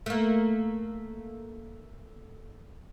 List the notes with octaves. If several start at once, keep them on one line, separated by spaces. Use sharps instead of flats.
A3 A#3